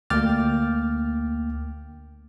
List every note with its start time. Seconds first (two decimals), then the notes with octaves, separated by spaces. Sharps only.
0.10 D2 A#3 G5 D6 F6 A6